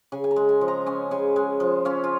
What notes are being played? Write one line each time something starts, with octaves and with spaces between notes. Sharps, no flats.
C#3 G#5
G#5
A#5
G#3
G#5
F3
A#5
C#4 G#5
C#3 G#5
G#3 G#5
F3
C#4 F5
F4